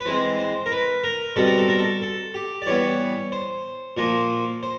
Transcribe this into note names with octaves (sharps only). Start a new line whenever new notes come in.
B4
E3 G#3 C4 C5
C5
A#4
B4
A#4
B2 G3 C4 A4
A#4
A4
A#4
A4
A4
G4
D5
E3 G3 B3 C#5
C5
A#2 F3 A#3
C5